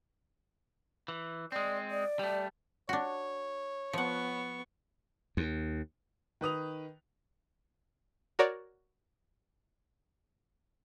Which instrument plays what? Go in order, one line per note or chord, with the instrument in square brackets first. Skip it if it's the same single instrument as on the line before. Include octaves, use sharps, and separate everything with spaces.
[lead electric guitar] E3
[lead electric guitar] G#3 C4 [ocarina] D5
[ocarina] D5
[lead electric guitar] G3 A3
[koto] D4 F#4 [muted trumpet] C#5
[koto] F3 F#5 [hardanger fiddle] B3 C#6
[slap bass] D#2
[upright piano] D#3 B4 D#6 F7
[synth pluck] F#4 A#4 C#5 D5